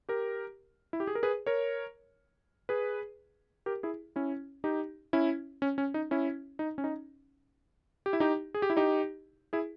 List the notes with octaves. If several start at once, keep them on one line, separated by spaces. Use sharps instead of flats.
G4 A#4
E4
G4
G#4
A#4
G#4 B4
A#4 C#5
G#4 B4
G4 A#4
E4 G#4
C#4 E4
D#4 G4
C#4 E4
C#4
C#4
D#4
C#4 E4
D#4
C#4
D#4
G4
E4
D#4 G4
G#4
G4
E4
D#4 G4
E4 G#4